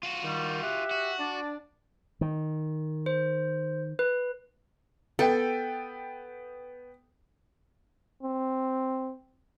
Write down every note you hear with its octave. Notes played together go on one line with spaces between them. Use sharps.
F4 F#4
D#3 G3
G4 E5 F#5
F#4
D4 D5
D#3
C5
B4
B3 A4 G5
C4